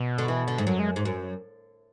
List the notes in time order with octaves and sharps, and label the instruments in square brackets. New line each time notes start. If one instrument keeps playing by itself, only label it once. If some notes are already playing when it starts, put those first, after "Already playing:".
Already playing: [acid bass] B2
[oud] D3
E3
D3
G#2
[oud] F#2 [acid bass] F#3
[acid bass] G#3
[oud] G#2
F#2